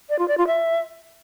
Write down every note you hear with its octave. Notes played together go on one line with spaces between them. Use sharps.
D5
F4
D5
F4
E5